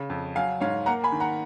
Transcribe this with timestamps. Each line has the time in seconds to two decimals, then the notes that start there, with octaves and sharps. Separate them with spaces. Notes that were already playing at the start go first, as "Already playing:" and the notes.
Already playing: C#3
0.10 F2
0.35 F#3 F5 G#5
0.60 G#2 C#5 F5
0.86 A#3 F#5 A#5
1.04 G#5 B5
1.12 D#3
1.20 F#5 A#5